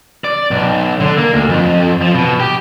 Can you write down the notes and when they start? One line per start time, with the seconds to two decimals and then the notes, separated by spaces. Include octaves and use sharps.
0.24 D5
0.51 B1
1.00 D3
1.17 A#3
1.33 D2
1.49 F2
2.02 F3
2.14 B2
2.40 G4